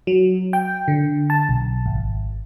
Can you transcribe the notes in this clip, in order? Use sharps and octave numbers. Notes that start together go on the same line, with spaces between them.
F#3
G5
D3
A5
B1
G#1